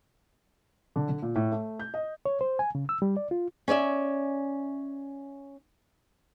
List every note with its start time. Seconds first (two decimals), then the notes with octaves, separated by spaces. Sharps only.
0.96 D3
1.09 D3
1.22 A#2
1.36 A2
1.52 A3
1.79 G6
1.94 D#5
2.26 C#5
2.41 C5
2.59 G#5
2.75 C#3
2.89 E6
3.02 G3
3.17 D5
3.31 F4
3.68 C#4 C#5 D5 E5